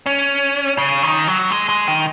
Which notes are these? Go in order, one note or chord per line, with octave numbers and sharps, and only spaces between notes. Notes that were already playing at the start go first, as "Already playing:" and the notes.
C#4
C#3
D#3
F#3
G#3
G#3
D#3